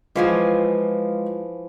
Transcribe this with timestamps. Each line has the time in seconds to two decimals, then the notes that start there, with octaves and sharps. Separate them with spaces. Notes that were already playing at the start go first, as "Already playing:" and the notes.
0.16 E3 F3 G#3 F4 F5 G#5